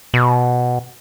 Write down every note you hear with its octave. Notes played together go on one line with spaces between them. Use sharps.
B2